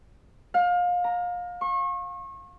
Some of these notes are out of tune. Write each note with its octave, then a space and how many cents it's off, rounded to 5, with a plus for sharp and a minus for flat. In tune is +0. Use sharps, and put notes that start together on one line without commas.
F5 +30
A#5 +0
C#6 -35